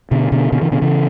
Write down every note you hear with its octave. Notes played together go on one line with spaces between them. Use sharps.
B2 D3
B2 D3
B2 D3
C#3 E3
B2 D3
C#3 E3